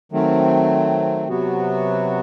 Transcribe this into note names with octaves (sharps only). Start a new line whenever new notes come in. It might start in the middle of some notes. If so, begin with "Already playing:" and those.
D#3 F#3 A3 C4
C3 F#3 B3 F#4